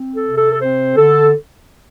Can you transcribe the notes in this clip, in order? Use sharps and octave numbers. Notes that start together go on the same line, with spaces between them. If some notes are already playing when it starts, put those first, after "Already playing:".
Already playing: C4
A4
C3
A4
A4
C4 C5
D3 A4